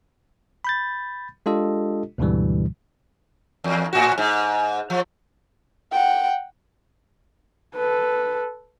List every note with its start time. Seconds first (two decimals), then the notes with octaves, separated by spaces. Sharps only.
0.65 B5 G6 A6
1.46 G#3 D4 F4 G4 A4 D#5
2.18 D2 G#2 B2 D3 E3 G3
3.64 E2
3.93 A2 F#4
4.18 G#2
4.90 F3
5.92 F#5 G5
7.75 A4 B4